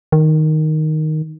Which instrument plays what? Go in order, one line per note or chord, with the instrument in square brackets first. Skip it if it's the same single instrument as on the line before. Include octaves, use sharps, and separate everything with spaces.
[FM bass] D#3